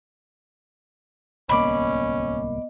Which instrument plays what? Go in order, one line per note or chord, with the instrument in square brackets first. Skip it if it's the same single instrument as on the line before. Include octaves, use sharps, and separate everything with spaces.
[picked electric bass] D1 C2 A#3 [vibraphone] B3 D#5 [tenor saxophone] C#4 [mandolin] D5 B5